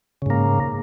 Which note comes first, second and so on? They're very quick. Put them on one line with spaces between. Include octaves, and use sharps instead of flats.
C#3 G#2 A#3